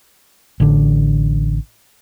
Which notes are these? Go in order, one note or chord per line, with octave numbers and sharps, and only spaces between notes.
A1 D3